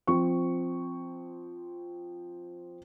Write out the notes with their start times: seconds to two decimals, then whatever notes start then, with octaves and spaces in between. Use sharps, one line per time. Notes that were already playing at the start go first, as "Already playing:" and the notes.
0.07 F3 C4 C#6